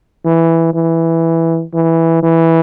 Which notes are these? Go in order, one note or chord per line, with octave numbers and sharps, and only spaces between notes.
E3
E3
E3
E3